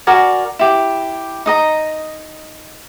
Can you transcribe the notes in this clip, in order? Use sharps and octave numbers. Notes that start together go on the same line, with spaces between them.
F#4 A#4 D5 G#5
E4 G4
D#4 D#5 A#5